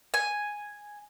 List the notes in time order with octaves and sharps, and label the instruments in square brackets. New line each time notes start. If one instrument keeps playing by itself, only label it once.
[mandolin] G#5